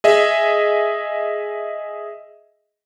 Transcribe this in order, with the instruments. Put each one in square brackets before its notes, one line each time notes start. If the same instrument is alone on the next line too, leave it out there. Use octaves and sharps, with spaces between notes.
[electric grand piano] G#4 D#5 E5